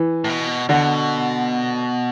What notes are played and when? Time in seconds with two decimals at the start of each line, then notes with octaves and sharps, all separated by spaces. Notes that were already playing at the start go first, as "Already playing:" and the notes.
Already playing: E3
0.24 A2
0.29 B2
0.69 B2 D3